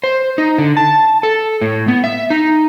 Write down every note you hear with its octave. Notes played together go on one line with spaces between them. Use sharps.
C5
D#4
D3
A5
A4
A2
B3
E5
D#4